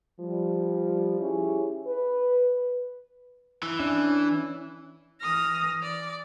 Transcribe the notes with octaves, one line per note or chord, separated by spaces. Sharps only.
F3 G3
C#4 E4 G4 G#4
B4
E3
C#4 D4 E5
E3 D#6 F6 A#6
D5